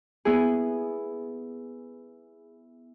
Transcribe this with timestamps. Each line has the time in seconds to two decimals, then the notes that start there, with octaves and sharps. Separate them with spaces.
0.25 B3 E4 G#4